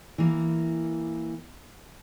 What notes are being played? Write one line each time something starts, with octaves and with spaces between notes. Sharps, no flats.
E3 A#3